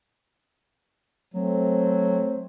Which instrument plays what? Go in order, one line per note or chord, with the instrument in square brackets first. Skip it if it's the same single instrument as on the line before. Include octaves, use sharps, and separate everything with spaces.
[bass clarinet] F#3 [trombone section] A3 C4